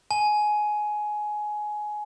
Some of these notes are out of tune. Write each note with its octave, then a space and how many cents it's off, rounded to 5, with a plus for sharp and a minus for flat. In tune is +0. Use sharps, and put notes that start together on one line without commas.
G#5 +15